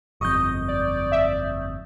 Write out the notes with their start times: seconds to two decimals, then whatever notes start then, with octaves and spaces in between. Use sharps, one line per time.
0.21 G1 F2 D#5 C#6 D#6 G6
0.68 D5
1.12 E5